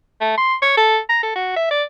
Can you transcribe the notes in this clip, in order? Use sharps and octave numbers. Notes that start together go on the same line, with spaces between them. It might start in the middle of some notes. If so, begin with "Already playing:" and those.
A3
C6
C#5
A4
A#5
A4
F#4
E5
D5